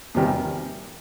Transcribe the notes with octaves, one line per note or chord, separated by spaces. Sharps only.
E2 C3 D#3 G3